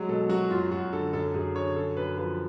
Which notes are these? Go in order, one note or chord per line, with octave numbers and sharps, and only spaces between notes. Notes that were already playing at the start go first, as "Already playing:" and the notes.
Already playing: F#3 G#3
B2 A4
F#3 F#4
F#2 F4
F#2 F#4
D3 A4
F#2 A4
F#2 G#4
D3 C#5
F#2 A4
F#2 B4
F3 B4